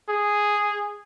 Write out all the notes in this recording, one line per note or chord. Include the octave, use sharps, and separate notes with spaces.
G#4